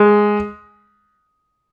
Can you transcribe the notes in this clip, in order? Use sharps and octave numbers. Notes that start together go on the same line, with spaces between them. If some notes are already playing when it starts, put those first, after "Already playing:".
Already playing: G#3